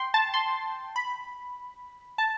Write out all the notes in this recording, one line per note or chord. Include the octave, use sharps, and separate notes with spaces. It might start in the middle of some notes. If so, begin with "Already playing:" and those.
Already playing: G5 C6
A5
C6
B5
A5